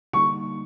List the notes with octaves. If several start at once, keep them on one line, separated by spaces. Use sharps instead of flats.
D3 G3 A#3 D#4 C#6